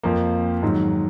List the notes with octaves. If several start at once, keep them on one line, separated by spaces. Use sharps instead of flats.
F2 F3 A#3
G#2 D#3 F#3